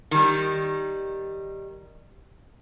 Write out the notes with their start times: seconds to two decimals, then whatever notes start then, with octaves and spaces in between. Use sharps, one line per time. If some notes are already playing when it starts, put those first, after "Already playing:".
0.11 D#3 G3